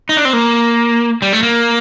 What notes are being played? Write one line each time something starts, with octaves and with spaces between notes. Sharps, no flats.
D#4
D4
C4
A#3
G3
A3
A#3